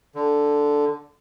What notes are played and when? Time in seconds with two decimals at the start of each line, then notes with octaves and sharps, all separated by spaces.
0.15 D3